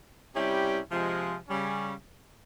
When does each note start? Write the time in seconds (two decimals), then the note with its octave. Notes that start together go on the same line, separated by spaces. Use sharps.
0.35 C3 G3 C#4 E4 G4
0.91 C3 F3 G#3
1.48 C#3 G3 C#4